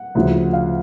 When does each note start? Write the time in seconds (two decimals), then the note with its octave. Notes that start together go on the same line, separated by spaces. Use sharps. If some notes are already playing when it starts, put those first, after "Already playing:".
Already playing: F#5
0.15 D2 C#3 F3
0.53 F5